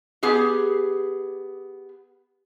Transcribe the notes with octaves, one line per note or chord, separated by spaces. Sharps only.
B3 G4 G#4